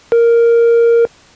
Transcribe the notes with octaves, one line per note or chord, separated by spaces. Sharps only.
A#4